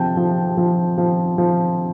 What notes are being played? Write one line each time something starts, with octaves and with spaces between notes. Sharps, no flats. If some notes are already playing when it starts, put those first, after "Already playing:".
Already playing: C3 F3 G5 A5
F3
F3
F3
F3